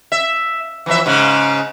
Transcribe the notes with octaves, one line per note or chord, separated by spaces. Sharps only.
E5
E3 F3 E5
G#2 C#3